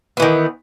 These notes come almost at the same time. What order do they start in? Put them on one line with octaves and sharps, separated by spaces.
B3 E3 D#3